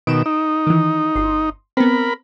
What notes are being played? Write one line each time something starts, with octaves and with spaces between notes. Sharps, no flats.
B2 D#3 D7 E7
D#4
D#3 E3
G1 C6
B3 C4 A#4 B5